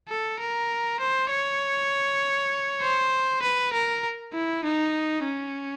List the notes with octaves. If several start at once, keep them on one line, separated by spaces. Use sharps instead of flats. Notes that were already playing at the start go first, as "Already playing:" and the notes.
A4
A#4
C5
C#5
C5
B4
A#4
E4
D#4
C#4